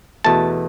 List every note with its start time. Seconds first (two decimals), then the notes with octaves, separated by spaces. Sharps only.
0.24 E2 B2 A3 A5